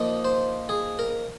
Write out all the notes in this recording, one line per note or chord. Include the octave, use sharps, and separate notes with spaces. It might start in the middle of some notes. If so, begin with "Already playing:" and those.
Already playing: F3 A#3 D#4 D#5
C5
G#4
A#4